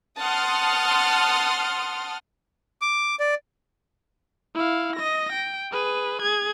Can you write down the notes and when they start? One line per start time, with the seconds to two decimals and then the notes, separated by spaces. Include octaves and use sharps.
0.20 F#5 A5 C6 D#6 F6
2.82 D6
3.20 D5
4.55 E4 F5
4.96 D#5 A#6
5.32 G5
5.72 G#4 B4
6.22 G#4 G#6